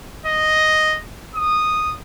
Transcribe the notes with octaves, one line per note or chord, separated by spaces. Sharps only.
D#5
D#6